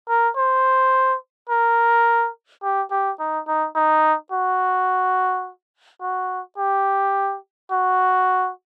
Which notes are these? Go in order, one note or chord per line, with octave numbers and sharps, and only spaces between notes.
A#4
C5
A#4
G4
G4
D#4
D#4
D#4
F#4
F#4
G4
F#4